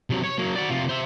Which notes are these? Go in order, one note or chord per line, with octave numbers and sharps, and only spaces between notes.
C3 F#3
C#5
F#3 A#3
F#4 D5
C3 F4
C5 E5